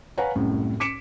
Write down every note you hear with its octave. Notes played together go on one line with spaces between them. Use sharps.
B4 C#5 F5 F#5 G#5 A#5
C2 F#2 A2
D6 B6 C#7 D7 E7